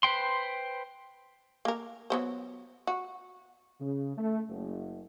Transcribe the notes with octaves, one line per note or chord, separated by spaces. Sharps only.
B4 C5 G5 C6
A#3 A#4
F#3 B3 C5
F#4
C#3
A3
F#1